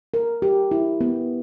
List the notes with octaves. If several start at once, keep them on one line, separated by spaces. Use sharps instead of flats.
A#4
G4
E4
B3